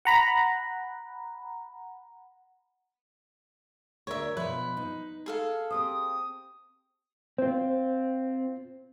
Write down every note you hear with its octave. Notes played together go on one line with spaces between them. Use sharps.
F#5 A#5 B5
D2 A#4 C#5 D5 E5
B2 F3 B4
D#4
G#4 A4 F5
C4 G4 C5 D#6
C4 F4 C5